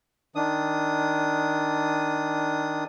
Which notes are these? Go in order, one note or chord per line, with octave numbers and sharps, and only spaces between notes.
D#3 D4 D#6